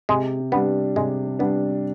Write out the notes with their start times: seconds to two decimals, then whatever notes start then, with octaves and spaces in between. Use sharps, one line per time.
0.09 C3 G#3
0.52 G3 B3 D4
0.96 C3 G#3
1.39 G3 B3 D4